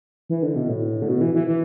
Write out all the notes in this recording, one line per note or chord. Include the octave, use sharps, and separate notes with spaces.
E3
D3
B2
A2
D3
B2
E3
E3
E3